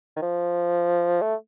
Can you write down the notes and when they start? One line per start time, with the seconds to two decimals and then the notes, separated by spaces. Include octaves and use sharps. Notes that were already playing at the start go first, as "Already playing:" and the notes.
0.17 D#3
0.22 F3
1.22 A3